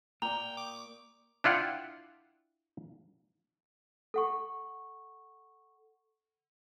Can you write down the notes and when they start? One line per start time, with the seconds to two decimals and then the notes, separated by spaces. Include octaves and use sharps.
0.22 A#3 D5 G5 A#5 F7
0.57 D6
1.44 D4 E4 F4 F#5 G5
4.14 A4 F#5 C#6